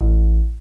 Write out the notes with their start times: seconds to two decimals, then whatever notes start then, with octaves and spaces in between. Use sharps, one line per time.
0.01 A1